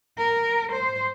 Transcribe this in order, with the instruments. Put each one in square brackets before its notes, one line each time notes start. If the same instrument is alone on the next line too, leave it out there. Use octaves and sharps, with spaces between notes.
[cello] A#4
C5